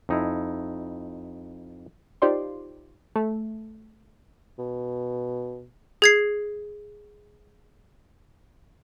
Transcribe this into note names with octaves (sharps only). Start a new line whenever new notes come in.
F2 D#4 E4
D#4 F4 G4 C5 D5 C6
A3
B2
G#4 G#6 C7